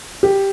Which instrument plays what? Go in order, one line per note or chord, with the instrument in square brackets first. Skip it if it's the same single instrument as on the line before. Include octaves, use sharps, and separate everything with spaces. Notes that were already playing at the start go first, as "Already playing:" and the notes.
[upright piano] G4